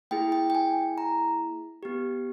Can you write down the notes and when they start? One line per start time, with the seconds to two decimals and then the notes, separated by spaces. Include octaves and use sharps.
0.11 A#3 E4 G#4 G5
0.32 G5
0.50 G5
0.55 G#5
0.98 A#5
1.83 B3 G4